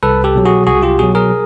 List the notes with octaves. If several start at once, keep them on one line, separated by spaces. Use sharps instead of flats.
C2 A4 B4
G4 A4
B2 F#3
F#4 G#4
C2 F#4 G#4
F4 G4
B2 F#3 F#4 G#4
G#4 A#4